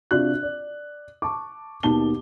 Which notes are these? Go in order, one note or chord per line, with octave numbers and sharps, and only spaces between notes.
C3 D4 F4 F#4 F#6
D5
A5 C#6 D6
D#2 B2 D#3 A5 G7